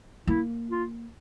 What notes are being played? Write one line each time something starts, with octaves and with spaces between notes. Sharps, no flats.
A#3 E4
F4